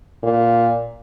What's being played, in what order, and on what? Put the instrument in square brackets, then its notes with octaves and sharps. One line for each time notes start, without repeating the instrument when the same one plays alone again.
[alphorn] A#2